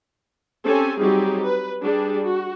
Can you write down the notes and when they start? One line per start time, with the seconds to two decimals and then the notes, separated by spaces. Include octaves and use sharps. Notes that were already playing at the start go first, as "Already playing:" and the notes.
0.64 C4 C#4 G4 A4 G#5
0.99 F#3 G3 C4 D#4 G4 G#4
1.44 B4
1.83 G3 D4 G4 G#4
2.23 F#4